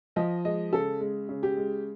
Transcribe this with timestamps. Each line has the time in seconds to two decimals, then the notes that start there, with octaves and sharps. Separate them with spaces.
0.16 F3 D#5
0.44 G#3 D#5
0.73 C#3 A4
1.00 G#3
1.29 C#3
1.43 G4
1.57 G#3